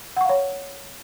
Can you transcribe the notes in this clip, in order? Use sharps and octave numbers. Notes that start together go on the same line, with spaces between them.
C#5 F5 F#5 C#6